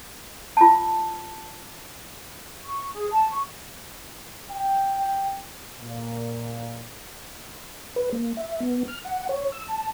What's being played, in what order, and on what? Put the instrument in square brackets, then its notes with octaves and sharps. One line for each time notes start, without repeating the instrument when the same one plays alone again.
[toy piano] F4 A5
[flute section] C#6
G#4
A5
C#6
[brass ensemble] G5
A#2
[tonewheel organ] B4
A#3
E5
B3
F6
F#5
C#5
E6
A5